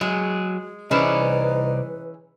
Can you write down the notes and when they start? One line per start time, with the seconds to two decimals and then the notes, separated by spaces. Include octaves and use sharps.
0.01 F#3 G#3 G#4
0.91 C2 E3 C#4 D#4 G#4 B4 C5 D5